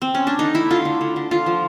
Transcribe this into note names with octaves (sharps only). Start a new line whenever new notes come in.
C4
C#4
D4
D3 D#4
A3 E4
D3 F4
D3
D3
D3
D3 F4
F3